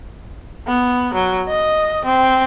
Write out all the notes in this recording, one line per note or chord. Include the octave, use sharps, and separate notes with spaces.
B3
F#3
D#5
C4